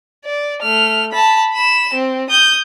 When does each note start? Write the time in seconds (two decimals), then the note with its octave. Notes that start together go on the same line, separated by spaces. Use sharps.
0.25 D5
0.62 A3 F6
1.12 A5 B5
1.53 B5 E7
1.94 C4
2.30 D#6 G6